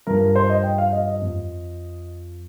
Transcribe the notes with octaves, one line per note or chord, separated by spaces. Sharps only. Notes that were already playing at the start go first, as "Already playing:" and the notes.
G2 F3 A#4
A#4
C5
D#5
G5
F5
D#5
D#5
F2 F3